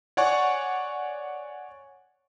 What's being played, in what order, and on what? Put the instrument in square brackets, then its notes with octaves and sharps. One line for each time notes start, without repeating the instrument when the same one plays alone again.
[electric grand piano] C#5 D5 F#5 G#5 C#6